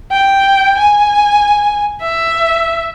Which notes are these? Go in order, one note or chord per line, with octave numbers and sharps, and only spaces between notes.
G5
G#5
E5